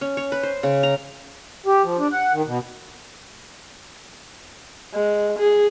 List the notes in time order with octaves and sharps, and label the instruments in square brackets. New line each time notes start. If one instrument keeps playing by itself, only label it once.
[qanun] C#4
C#5
B4
C5
C#3
A#5
[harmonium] G4
F3
D4
F#5
D#3
B2
[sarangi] G#3
G#4